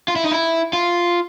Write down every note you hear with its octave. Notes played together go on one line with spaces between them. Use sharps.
F4
E4
D#4
E4
F4